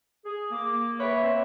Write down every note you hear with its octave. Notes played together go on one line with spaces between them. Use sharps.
G#4
A#3 D6
B4 C#5 E5 G5 B5
C4